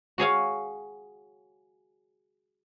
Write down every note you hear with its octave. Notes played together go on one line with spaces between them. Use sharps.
F#4 G#4 C#5 F5